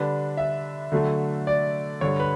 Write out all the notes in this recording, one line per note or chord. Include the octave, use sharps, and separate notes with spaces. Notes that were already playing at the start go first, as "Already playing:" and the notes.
Already playing: D3 G3 D4 B4
E5
D3 F#3 A3
D5
G2 D3 G3 C#5
B4